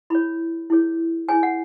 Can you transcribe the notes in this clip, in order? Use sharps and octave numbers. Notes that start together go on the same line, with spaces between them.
E4 G#4 C#5 B5
E4 G#4 C#5
E4 G#4 C#5 G#5
F#5